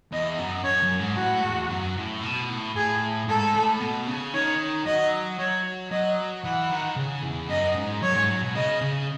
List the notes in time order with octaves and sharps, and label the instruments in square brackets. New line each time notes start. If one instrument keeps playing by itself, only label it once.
[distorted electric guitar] E2 [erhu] D#5
[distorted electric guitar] F#2
[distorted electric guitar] F#2 [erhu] C#5
[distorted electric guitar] F#2
G#2
[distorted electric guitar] A2 [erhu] F#4
[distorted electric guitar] E2
F#2
A2
B2
A2
[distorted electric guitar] A2 [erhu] G#4
[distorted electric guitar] G#2 [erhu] A4
[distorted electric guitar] A2
B2
C#3
[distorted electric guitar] D#3 [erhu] C#5
[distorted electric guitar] F#3 [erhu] D#5
[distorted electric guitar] F#3 [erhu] C#5
[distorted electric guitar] F#3 [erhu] D#5
[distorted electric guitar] E3 [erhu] F#5
[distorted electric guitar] D#3
C#3
E2
[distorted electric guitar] F#2 [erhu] D#5
[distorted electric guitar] G#2
[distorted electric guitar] F#2 [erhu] C#5
[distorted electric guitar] G#2
F#3
B2
[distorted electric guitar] C#3 [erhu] D#5
[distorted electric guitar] C#3